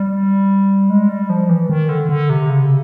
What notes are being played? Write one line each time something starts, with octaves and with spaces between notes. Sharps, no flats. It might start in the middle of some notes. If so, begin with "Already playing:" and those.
Already playing: G3
G#3
G3
F3
E3
D#3
D3
D3
C3
C#3